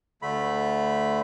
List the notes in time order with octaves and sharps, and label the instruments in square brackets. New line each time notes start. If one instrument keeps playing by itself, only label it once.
[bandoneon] D2 D3 A3 B5